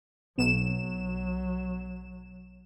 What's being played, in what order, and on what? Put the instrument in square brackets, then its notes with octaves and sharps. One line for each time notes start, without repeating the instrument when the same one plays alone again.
[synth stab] B1 E7 [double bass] F#3